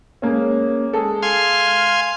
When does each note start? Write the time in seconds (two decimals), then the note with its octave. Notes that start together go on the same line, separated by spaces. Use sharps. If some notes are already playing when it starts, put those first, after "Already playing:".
0.22 G#3 A#3 C#4
0.93 G#3 G#4 A4
1.23 F5 G#5 C6
1.67 F6